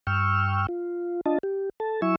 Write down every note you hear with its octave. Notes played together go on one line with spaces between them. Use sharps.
G2 G5 C#6 E6 F6
F4
D4 F4 D#5 A5
G4
A4 A5
F#3 E4 E5 G#5 C#6 E6